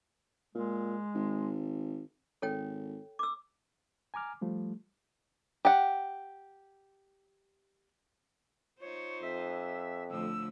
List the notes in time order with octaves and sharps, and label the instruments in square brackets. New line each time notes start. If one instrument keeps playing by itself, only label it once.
[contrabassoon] A#2 [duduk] G#3
[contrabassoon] G#1
[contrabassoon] G#1 [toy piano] A4 C#5 G5
[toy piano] D6 E6
[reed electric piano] G#5 A#5 D6 F6
F3 G3 A3
[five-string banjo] G4 F#5
[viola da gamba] D#4 F4 C5 [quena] C#5
[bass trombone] F2 [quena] E5
[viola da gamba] A2 D3 F3 [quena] E6